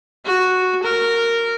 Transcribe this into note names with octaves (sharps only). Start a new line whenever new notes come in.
F#4
A#4